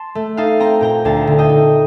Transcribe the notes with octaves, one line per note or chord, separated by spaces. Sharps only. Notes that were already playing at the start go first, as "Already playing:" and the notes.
Already playing: A5 C6
A3
D#4 F5 A5
C4 G5 A#5
A#2 G5 A#5
D2 F5 A5
D3
D#5 G5
D#4